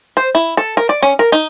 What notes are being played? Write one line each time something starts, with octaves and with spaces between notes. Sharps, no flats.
C5
E4
A4
A#4
D5
C#4
A#4
D#4